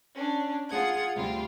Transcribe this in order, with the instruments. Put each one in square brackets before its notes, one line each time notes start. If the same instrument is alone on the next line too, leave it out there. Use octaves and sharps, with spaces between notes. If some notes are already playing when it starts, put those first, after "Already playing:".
[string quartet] C#4 D4
F4 G#4 F#5 G#6
D2 C3 G3 F4 G5